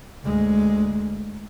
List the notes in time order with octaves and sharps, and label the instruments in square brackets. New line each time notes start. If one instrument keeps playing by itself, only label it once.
[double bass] D2 G#3